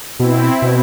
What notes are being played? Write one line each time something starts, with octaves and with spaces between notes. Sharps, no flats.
B2 C4 E4
B2